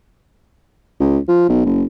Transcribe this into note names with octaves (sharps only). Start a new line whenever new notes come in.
C#2
F3
B1
F#1